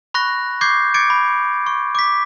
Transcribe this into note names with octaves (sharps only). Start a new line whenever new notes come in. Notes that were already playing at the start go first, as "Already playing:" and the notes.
B5 C#6 F#6 A#6
C#6 D6 G6 G#6 C7
D6 G#6 A6 C#7 D7
B5
C#6
D6 B6